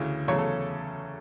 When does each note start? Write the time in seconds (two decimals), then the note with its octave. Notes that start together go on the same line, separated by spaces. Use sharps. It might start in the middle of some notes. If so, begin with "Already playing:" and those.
Already playing: D2 C#3 E3
0.28 E2 C#3 F#3 A3 C#4 C#5
0.38 A4